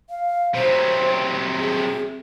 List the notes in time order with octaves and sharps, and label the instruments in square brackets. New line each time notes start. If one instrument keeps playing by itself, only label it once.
[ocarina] F5
[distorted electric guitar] C3 F#3 [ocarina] C5
[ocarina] G#4